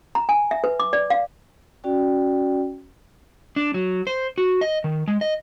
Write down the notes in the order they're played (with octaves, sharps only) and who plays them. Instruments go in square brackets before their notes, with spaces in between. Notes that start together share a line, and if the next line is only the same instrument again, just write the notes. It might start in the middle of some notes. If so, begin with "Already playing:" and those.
[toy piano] A#5
G#5
E5
B4
D6
D5
F5
[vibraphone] C#4 F#4 D5 G5
[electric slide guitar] D4
F#3
C5
F#4
D#5
D#3
G#3
D#5